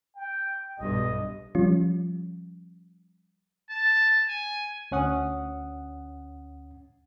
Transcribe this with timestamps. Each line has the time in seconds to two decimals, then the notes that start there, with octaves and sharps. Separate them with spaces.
0.15 G5
0.78 B1 G2 D#5
1.55 F3 G3 C#4 F4
3.70 A5
4.28 G#5
4.91 D2 C#4 F#5 D#6